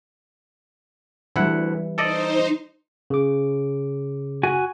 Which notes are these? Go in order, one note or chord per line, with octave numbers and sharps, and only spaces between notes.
D2 E3 G3 E4 F#5
D#4 A4 C5 D5 D#5
C#3 D6
F#4 G#5